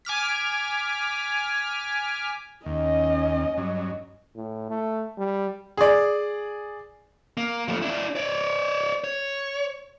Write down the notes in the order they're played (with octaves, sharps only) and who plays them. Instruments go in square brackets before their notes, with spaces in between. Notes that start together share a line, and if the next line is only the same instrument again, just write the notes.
[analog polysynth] G#5 D6 F6 B6
[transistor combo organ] D#2 [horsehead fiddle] C#4 D#5
[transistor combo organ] G2 F#3
[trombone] A2
A3
G3
[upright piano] G#4 D5
[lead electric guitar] A#3
F3 A3
D4 E4
C#5 D5
C#5